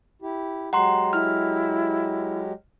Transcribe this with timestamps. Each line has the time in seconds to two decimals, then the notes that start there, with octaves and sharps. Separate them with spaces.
0.22 E4 G4
0.73 F#3 G#3 G4 F#5 A#5 C6
1.13 E4 F6